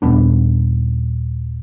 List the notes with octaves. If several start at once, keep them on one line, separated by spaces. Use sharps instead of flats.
D#1 B3 D4